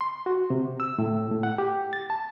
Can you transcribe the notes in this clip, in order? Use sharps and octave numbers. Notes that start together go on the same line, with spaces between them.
C6
F#4
C3
E6
A2
A2
F#5
G4
A6
A5